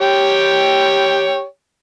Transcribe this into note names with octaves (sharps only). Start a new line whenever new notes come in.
G4 C#5 G5